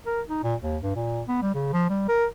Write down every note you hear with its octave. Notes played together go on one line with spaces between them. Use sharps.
A#4
D#4
A#2
D#2
G2
A#2
B3
G3
C#3
F3
G3
A#4